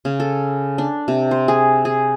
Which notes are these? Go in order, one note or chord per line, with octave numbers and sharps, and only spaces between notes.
C#3
A4
D4
C3
C5
G#4
G#4